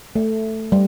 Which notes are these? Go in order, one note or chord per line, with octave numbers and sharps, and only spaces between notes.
A3
G3